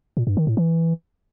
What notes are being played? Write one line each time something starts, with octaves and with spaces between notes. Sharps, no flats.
A#2
G2
D#3
A2
E3